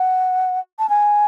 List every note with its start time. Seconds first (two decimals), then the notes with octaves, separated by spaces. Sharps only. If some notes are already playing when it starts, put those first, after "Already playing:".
Already playing: F#5
0.79 A5
0.90 G#5